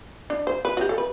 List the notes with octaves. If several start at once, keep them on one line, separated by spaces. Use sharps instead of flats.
D4
C5
B4
F#4
G4
A4
B4